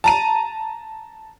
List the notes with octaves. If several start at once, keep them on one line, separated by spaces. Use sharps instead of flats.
A5 A#5 D#7